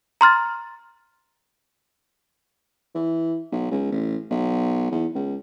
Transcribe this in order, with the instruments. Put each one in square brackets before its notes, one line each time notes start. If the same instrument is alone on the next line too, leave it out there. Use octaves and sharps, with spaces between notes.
[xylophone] A#5 C6 F6 A6
[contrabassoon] E3
B1
C#2
A1
B1
E2
C#2